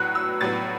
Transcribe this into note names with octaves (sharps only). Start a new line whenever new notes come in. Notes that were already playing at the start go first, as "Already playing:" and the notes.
Already playing: A2 F#3 B3 F#6
E6
A2 F#3 B3 A6